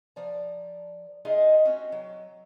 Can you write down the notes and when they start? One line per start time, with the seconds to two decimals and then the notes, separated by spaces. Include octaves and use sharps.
0.16 F3 D5 A#5
1.25 G#3 D#4 F4 G#4 D#5 E5
1.65 C4 C#4 F#4
1.92 F#3